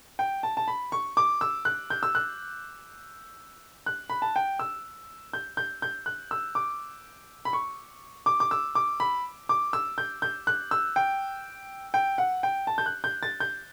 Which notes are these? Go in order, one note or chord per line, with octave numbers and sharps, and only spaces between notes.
G5
A5
A5
B5
C#6
D6
E6
F#6
G6
E6
F#6
F#6
B5
A5
G5
E6
G6
G6
G6
F#6
E6
D6
B5
C#6
D6
D6
E6
D6
B5
D6
E6
G6
G6
F#6
E6
G5
G5
F#5
G5
A5
G6
F#6
G6
A6
G6